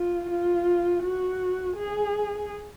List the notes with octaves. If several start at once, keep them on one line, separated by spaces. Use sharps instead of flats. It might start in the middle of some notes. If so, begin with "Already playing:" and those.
Already playing: F4
F4
F#4
G#4